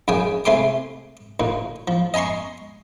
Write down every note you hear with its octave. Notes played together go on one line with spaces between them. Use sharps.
F#2 C#3 G5 G#5 D#6
C3 A3 G#5 C6 D6
D2 A#2
F3
D#5 G#5 A#5 C6 C#6